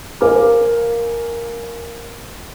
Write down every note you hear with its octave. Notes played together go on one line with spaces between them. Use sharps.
A#4 C5 F5 G#5 D6 F6